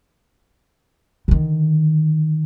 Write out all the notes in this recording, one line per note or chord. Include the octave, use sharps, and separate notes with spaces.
D3 D#3